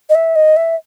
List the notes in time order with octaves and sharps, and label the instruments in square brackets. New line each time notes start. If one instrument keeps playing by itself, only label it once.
[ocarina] D#5
E5
D#5
E5